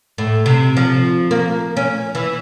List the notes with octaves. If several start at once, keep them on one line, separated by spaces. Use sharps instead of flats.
A2
C3
F3
A#3
C#4
E3